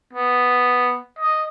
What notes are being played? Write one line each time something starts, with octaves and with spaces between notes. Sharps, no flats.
B3
D#5